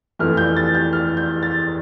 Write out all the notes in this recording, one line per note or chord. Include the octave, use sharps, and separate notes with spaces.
F2 E3 A3 F6
G6
A6
G6
F6
G6
A6